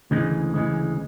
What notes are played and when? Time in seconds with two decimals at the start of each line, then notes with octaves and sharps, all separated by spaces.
0.11 D2 C#3 E3 G#3
0.54 D2 C#3 E3 G#3